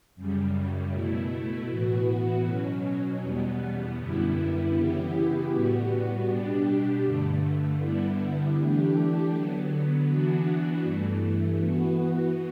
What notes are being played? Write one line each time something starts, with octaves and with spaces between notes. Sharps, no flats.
F#2 C#3 G3
B2 A3 E4
A2 E3 B3 F#4
B2 F#3 C#4
E2 B2 G3 B3
F#2 D3 G3 B3 E4
C#3 E3 B3 E4 G4
A2 G3 B3 F#4
B2 G3 D4 G4
G2 D3 A3
D3 G3 B3 E4
E3 A3 D4 G4
D3 F#3 B3
E3 B3 D4 F#4
G2 E3 A3
E3 B3 F#4